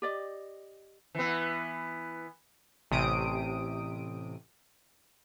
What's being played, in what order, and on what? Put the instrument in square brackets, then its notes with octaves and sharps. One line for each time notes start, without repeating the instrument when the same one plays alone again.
[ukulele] G4 D5 D#5
[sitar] E3 B3
[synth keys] A1 C3 D#6 D7